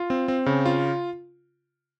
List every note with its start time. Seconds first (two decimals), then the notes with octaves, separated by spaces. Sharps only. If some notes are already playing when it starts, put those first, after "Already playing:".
Already playing: F4
0.10 C4
0.28 C4
0.46 C#3
0.66 F4